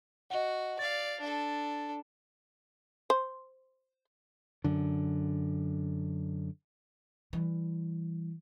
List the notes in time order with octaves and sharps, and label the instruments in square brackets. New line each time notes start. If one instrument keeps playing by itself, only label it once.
[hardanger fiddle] F#4 [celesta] D#5 F#5
[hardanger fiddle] D5 F5 [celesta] A6
[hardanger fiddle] D4 A4
[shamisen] C5
[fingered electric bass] F#2 D3
[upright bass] E3 G3